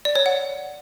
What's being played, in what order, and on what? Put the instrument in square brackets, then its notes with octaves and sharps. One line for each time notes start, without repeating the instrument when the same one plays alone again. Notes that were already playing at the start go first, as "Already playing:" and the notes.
[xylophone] D5
C#5
F#5